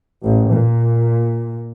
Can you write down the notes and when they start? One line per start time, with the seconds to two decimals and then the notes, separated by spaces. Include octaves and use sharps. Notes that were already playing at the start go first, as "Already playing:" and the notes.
0.24 A1
0.54 A#2